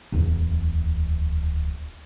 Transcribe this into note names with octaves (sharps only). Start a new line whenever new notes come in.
D1 E2